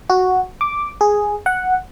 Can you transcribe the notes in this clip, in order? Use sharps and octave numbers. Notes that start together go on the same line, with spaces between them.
F#4
D6
G#4
F#5